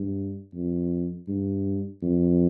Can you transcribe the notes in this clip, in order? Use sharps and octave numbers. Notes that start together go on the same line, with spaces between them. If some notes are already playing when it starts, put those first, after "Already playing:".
Already playing: G2
F2
G2
F2